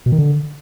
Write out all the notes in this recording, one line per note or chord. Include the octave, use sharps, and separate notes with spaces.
B2
D#3
D3